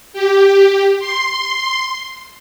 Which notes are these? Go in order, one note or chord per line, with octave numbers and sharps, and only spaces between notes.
G4
C6